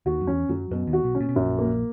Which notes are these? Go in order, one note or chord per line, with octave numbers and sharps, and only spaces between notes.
D#2 D#3 F#4
F#2
E2 C#4
F#2 F#3
F#2 B2
D#2 D#3
F#4
B1 B2
C#4
A#2
B2
A#1 F#2 A#2
A#3